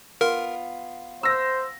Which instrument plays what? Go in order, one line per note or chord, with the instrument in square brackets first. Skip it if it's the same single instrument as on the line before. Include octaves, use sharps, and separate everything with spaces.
[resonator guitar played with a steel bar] B3 F4 [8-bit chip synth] A#4
[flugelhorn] C5 [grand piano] E6 A#6